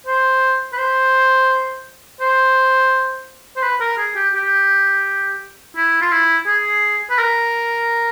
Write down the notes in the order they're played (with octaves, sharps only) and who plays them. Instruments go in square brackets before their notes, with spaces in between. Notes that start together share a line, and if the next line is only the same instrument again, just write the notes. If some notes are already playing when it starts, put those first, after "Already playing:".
[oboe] C5
B4
C5
C5
C5
B4
A#4
G#4
G4
G4
E4
F4
E4
G#4
B4
A#4